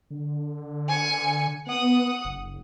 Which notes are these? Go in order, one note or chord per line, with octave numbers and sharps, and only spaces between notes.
D3
G#5 C#7
B3 F#5 D#6
F#1